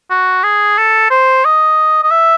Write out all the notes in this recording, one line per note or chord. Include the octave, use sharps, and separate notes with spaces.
F#4
G#4
A4
C5
D#5
D#5
E5